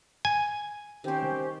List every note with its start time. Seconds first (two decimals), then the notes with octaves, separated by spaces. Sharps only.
0.25 G#5
1.04 D#3 C4 C#4 G4 C5